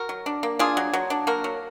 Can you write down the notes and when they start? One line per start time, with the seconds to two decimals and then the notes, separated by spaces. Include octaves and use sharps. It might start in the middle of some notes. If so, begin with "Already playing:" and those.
Already playing: F#4 A#4
0.09 F#3
0.26 D4
0.43 A#3
0.59 D4 F4 G#4
0.77 F#3
0.93 F#3
1.10 D4
1.27 A#3 F#4 A#4
1.44 F#3